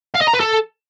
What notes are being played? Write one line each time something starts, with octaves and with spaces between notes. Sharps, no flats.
F5
D#5
A#5
B4
A4